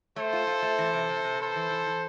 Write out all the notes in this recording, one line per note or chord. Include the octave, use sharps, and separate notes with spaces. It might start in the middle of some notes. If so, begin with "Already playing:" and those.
A3 A4 C5
F4
F4
A3
E3
C3
C3
C3
A4 B4 C5
E3
E3
E3